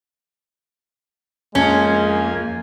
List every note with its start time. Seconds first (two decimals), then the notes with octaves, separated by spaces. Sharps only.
1.55 F2 G#3 A#3 C#4 G#5